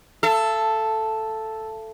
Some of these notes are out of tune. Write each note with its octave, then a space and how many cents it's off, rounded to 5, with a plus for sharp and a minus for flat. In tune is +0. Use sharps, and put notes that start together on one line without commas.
A4 +0 E5 +45